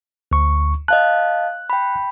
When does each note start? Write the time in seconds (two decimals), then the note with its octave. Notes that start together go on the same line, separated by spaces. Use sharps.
0.31 D2 C#6
0.88 D#5 F5 A5 F#6
1.70 G5 B5